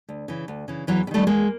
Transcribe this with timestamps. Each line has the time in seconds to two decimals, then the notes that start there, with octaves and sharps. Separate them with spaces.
0.09 D2
0.28 C#3 E3
0.48 D2
0.68 C#3 E3
0.87 E2 E3 F#3
1.07 C3
1.11 D#3 G3 A3
1.27 E2 G#3 A#3